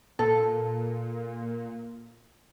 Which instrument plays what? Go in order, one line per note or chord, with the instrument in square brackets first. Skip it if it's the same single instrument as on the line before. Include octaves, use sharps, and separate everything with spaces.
[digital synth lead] A#2 [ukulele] A4